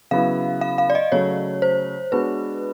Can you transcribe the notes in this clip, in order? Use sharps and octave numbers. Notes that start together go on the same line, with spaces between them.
C#3 F#3 B3 E4 F5
F5
F5
D5
D#5
C#3 F#3 A3 C#5
C5
G#3 B3 D4 F#4 B4